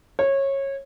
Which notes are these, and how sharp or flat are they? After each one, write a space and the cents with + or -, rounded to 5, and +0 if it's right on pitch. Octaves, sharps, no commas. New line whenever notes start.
C#5 -20